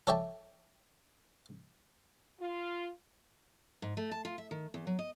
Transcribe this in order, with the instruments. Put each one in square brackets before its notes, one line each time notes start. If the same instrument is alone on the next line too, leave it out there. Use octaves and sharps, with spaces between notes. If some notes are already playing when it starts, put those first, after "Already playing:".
[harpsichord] A4 C#5 D5 E5 G5 A5
[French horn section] F4
[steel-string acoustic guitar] G#2
A3
A5
F4
E5
D#3
E2
F#3
D#5